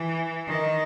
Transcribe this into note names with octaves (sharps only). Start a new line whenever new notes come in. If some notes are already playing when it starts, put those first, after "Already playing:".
Already playing: E3
D#3